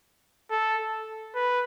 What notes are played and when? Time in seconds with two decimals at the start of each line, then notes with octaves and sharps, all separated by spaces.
0.51 A4
1.36 B4